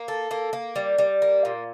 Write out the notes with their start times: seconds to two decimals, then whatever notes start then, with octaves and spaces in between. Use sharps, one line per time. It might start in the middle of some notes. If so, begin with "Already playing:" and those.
Already playing: A#3
0.08 A4
0.31 A#3
0.53 A#3
0.76 G3
0.98 G3
1.22 A#3
1.45 A#2